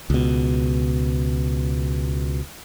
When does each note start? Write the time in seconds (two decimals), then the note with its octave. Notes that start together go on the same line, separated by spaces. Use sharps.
0.10 C#2 B2